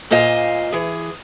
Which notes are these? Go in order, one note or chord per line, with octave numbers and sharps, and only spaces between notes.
A#2 F4 C5 D#5 F5 G#5
E3 G#4